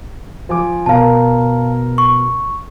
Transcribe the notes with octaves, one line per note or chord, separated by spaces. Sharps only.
F3 G#5 D6
B2 A#4 F5 A5
C#6